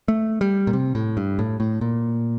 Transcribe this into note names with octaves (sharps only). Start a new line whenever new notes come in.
A3
G3
A#2
C3
A2
G2
A2
A2
A#2